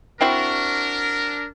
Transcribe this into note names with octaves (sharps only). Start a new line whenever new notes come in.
C4 D4 E4 F#4 A#4